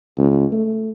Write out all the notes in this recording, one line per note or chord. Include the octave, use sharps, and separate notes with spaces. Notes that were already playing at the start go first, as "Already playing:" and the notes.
C#2
A3